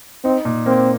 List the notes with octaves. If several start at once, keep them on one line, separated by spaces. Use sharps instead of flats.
C4 D#4
A#2
A#3 C4